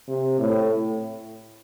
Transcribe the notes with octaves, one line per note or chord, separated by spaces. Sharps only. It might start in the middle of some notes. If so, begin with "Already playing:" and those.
C3
A2